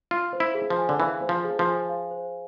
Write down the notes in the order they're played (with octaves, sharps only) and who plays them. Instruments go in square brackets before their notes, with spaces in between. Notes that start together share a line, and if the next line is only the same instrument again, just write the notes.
[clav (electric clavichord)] F4 [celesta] F5
[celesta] C5
[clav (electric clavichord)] E4
[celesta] G#4
[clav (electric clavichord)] F3
[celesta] G#5
[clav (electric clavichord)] D3
[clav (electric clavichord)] E3 [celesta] F5
[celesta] C5
[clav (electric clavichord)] F3
[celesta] G#4
[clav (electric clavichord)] F3
[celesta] G#5
F5
C5